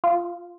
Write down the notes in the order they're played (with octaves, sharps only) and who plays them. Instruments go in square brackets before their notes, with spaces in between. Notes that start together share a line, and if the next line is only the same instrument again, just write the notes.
[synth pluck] F4